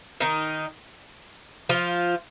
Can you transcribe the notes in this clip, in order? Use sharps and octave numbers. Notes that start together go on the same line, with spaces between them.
D#3 D#4
F3 F4